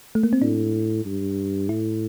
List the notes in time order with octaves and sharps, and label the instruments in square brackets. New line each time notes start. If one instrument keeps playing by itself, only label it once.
[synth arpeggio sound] A3
A#3
C4
[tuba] A2 [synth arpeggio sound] D4
[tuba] G2
[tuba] A2 [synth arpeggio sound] E4